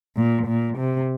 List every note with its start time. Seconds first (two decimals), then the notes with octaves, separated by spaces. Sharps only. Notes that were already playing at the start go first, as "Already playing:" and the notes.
0.17 A#2
0.47 A#2
0.79 C3